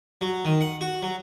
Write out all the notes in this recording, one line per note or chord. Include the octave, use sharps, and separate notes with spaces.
F#3
D#3
F#5
F#4
F#3